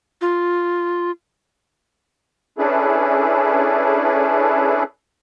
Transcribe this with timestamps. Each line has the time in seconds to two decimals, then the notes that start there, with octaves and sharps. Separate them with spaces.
0.21 F4
2.58 C#4 D4 E4 G#4 A4 B4